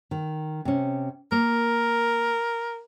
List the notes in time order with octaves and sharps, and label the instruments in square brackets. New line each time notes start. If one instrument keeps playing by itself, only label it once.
[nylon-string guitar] D#3
C3 C#4
[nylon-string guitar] A#3 [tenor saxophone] A#4